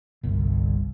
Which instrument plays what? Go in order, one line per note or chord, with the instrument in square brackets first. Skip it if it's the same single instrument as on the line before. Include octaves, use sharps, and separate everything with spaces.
[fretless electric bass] G1 C2